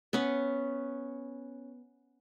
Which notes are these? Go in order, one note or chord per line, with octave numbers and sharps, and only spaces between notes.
B3 C#4